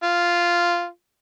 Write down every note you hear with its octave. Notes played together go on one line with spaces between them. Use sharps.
F4